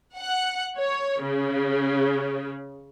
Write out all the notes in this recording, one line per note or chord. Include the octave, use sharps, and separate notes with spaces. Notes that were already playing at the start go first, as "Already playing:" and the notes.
F#5
C#5
C#3